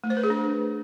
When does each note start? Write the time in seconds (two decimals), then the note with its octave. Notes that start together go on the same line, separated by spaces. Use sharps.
0.04 A3
0.10 C5
0.17 B4
0.23 G#4
0.30 D4